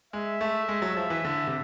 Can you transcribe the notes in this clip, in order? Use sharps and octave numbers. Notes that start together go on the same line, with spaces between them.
G#3 E5
A3
G#3
F#3
F3
E3
D3
C3